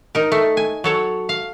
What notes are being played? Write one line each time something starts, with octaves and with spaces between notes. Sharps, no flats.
D#4 A#4
A3
G#5
F#3 A4 C#5
F5